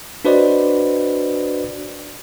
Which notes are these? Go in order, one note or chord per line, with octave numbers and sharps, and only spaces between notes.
D4 F#4 B4 C5 D5 D#5